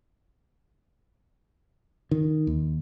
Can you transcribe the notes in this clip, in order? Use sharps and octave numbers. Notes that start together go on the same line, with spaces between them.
D#3
D#2